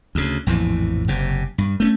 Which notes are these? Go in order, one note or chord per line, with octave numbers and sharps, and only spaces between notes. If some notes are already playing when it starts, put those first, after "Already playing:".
D2 C#3
A#1 F2 A2 E3
F#1 C3
G2
A3 C4 C#4